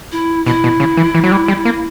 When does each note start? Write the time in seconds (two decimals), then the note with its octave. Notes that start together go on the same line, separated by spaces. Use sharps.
0.12 E4
0.46 B2 E4
0.64 B2
0.80 C#3
0.97 E3
1.14 E3
1.24 F#3
1.32 G3
1.48 G3
1.65 A#3